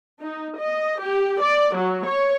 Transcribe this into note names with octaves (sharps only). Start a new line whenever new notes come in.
D#4
D#5
G4
D5
F#3
C#5